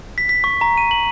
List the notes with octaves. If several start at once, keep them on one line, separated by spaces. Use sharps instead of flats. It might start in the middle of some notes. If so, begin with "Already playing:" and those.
B6
B6
C#6
A#5
D#7
F#7